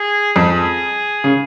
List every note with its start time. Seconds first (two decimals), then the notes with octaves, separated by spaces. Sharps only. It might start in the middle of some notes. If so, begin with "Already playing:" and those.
Already playing: G#4
0.36 F2 G#4
1.24 C#3